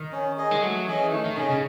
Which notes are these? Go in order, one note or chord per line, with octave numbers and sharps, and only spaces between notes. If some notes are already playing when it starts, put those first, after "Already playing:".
Already playing: D#3
C#4
G#4 D#5
G#3
F#3 A3
E3 C#4 G#4 D#5
D#3 A3
D#3
C#3 C#4 G#4 D#5
C#3